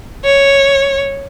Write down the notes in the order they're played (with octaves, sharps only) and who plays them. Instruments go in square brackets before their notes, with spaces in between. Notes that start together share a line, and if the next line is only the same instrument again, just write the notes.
[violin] C#5